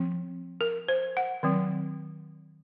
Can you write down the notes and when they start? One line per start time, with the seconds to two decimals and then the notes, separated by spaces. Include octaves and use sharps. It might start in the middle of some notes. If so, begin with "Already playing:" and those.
Already playing: F3 C4
0.61 A#4
0.88 C5
1.17 F#5
1.43 D#3 F#3 C4